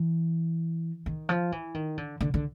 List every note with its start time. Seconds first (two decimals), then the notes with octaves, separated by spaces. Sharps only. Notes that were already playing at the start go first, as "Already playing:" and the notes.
Already playing: E3
1.06 D#3
1.29 F3
1.52 E3
1.74 D#3
1.98 D3
2.21 D3
2.34 D3